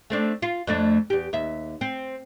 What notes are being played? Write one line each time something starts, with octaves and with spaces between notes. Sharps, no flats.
A3 C4 D4
F4
F2 A3 D4
E2 G4
D#2 E5
C4